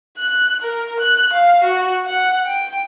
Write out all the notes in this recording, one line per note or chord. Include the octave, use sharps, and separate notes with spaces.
F#6
A#4
F#6
F5
F#4
F#5
G5